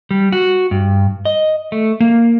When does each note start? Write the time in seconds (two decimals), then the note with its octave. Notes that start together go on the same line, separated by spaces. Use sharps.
0.11 G3
0.33 F#4
0.71 G2
1.25 D#5
1.72 A3
2.00 A#3